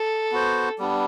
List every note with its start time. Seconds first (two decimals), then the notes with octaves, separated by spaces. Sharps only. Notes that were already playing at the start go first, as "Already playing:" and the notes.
Already playing: A4
0.32 B3 F#4 C5
0.79 G3 B3 D4